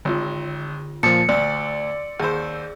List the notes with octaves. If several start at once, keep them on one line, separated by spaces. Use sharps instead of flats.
G#1 D3 F4
A#2 F3 A5 D#6 C#7
D2 D5 C6 E6
D#2 G#4 C5 E6